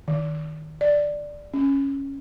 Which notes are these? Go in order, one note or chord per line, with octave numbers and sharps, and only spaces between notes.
D#3
D5
C#4